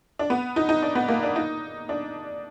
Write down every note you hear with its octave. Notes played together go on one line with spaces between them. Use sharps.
D4
B3
D#4
D#4
D4
B3
A#3
D4
D#4
D4